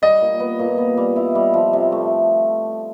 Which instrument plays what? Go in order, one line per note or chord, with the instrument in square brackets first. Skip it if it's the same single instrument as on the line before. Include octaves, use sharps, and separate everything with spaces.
[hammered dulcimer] G3 [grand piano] D#5
[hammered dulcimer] A#2
B3
A#2
B3
G3
E4
G3
F3
C3
A3